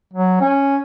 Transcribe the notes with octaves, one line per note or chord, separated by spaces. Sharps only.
F#3
C#4